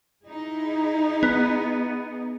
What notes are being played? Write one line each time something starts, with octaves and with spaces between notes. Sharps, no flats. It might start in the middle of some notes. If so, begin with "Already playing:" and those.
D#4 E4 G#4
B3